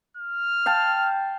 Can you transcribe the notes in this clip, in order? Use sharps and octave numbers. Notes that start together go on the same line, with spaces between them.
F6
F5 G5 A5